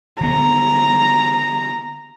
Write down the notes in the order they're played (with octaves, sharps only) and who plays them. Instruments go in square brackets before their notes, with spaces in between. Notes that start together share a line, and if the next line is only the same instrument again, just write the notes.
[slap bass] D3 B3 [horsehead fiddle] A#5